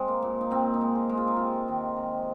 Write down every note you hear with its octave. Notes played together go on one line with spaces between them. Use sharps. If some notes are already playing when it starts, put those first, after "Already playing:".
Already playing: G#3 C4
A#3
A#2
D#4
A#2 C4
D#4
G#3
G#4
G#3
F4
D#4
C3 F4
D#3
C3